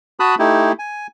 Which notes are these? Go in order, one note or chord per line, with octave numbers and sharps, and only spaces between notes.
F#4 A5 B5 D#6 F#6
A3 D#4 E4 G4
G#5